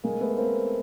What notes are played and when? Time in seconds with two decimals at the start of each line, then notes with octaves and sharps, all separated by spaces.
0.04 G#3 A#3
0.21 A3 B3
0.37 A#3 C4